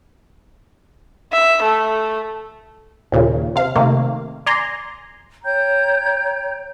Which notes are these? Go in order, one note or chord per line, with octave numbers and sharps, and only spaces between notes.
E5
A3
D#2 A#2 C#3
C3 F5
C3 D#3 A3 A#3
D5 G#5 A#5 C6
C#5 G5 A#5 G6